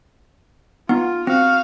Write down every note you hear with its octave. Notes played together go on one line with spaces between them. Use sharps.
B3 D#4 F4
C4 F#4 F5